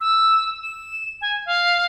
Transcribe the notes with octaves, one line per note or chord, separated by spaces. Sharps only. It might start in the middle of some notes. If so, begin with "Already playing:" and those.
E6
E7
G#5
F5